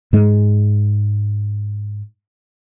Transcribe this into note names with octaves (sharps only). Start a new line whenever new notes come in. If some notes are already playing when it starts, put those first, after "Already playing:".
G#2 G#3